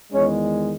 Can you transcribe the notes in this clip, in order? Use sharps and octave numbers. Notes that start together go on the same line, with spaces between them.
E2 D#3 G#3 C#4